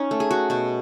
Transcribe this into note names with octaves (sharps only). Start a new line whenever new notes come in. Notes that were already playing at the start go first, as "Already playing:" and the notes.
Already playing: C#4 D#4
A3
G#4
F#4
B2 F#4